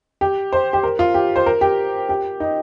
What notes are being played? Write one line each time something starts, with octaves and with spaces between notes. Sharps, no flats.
G4
C5
G4
A#4
F4
G4
C5
A#4
G4
G4
D#4